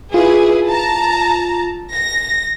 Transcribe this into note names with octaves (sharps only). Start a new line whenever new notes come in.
E4 F4 G#4 B4
A5 A#5
A#6